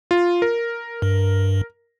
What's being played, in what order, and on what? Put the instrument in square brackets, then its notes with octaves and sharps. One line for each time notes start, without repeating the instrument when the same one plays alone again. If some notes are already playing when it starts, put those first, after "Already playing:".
[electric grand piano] F4
A#4
[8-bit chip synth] G2